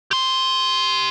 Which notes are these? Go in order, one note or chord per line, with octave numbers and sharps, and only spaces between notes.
G4 C6